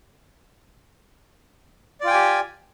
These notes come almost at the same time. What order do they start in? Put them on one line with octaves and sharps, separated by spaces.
D5 F4 G5 G#5 G4